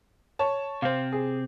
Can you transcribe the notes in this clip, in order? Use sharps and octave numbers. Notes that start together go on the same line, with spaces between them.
C#5 A5
C3 C4 C5 F5
G#4